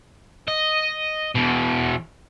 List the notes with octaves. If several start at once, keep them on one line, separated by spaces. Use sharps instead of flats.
D#5
E2 B2